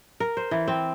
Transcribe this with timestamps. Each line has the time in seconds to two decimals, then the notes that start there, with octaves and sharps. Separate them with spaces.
0.20 A#4
0.37 C5
0.51 E3
0.68 C4